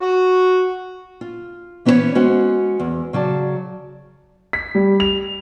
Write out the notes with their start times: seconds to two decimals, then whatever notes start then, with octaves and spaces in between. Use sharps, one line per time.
0.01 F#4
1.21 F4
1.85 E3 B3 C#4 E4 C5 C#5
2.15 G#3 C#4 F#4 C5 F#5
2.79 E2
3.13 C#3 F#3 D5 A5
4.53 B6
4.75 G3
5.00 F7